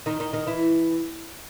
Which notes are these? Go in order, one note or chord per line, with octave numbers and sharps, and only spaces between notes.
D#3 D#4
D#3 D#4
D#3 D#4
E3 E4